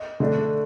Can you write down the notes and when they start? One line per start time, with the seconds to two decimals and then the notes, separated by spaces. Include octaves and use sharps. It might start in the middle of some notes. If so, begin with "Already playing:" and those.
Already playing: D#5
0.20 D3 A3 D4